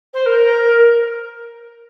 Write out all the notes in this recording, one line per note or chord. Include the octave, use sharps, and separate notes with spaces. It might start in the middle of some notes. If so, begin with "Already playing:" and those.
C5
A#4